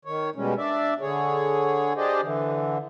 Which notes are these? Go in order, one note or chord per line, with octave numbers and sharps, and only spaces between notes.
D#3 C#5
B2 G3 G#3 C#4
D4 D5 E5
D3 G#4 C#5
D4 G4 G#4 C5 D5 D#5
D3 E3